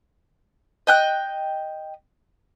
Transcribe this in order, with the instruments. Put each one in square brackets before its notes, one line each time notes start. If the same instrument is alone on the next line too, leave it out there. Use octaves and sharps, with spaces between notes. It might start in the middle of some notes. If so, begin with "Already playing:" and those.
[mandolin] D#5 G5 F#6